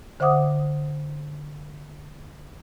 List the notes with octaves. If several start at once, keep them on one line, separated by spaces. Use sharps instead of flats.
D3 C5 E5 F#5 D6 D#6